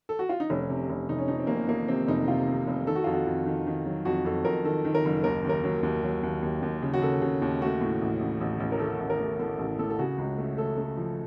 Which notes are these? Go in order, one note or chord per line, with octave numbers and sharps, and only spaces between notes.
A4
F#4
F4
D#4
F1 C#4
C3
F1
F1 D#4
C#4
F2 D#4
C4
F1 A#3
C4
F2 A#3
C3 C4
F1 D#4
C3 F4
C3
F1
D#3 A4
F#4
F2 F4
F#4
F2
D#3
D#3
F#3
F2 F#4
F2 A4
F2 A#4
D#3 A4
D#3
A#4
F#1
D#2 A#4
D#2 A#4
F#3
D#2
F#3
D#2
D#2
D#2
C#3
F#4
C#3 A4
C#3
D#2
A3 F#4
A2
A1
A1
A1
A1
A#4
A3 A4
A1
A#4
A3
A2 A4
A1
A2 A4
A4
C#3 F#4
C#2
A3
A3 A4
A3
F3